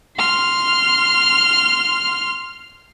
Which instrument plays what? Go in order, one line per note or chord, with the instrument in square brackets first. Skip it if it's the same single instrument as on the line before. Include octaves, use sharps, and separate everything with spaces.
[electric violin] C6 F6